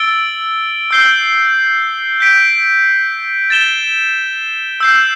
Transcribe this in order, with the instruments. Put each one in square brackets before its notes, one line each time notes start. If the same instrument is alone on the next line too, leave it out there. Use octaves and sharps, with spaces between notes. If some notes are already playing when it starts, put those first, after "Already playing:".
Already playing: [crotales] E6 A6 D7 G7
E6 G6 C7 G7
G6 B6 D7
A6 E7 G7
E6 G6 C7